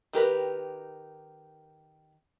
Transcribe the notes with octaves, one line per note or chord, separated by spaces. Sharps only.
D#3 G4 A#4 B4